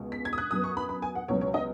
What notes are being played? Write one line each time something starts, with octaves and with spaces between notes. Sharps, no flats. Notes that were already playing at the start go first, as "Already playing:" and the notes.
Already playing: C#2 B2 G#3
B6
G#6
D#6
F#6
F#2 F#3 B3 D#6
C#6
B5
B5
G#5
F#5
C#2 B2 F#3 B3 C#5
C#5
D#5